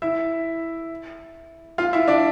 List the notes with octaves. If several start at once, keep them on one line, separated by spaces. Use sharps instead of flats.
E4 E5
F4 F5
E4 E5
D4 D5